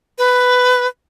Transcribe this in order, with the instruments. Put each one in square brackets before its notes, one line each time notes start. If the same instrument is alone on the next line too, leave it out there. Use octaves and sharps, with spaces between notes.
[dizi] B4